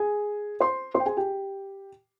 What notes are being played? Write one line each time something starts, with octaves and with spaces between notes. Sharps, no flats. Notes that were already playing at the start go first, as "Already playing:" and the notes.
Already playing: G#4 G#5
C5 C6
C5 C6
G5
G#4 G#5
G4 G5